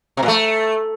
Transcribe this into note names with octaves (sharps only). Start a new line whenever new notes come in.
C3
A#2
A3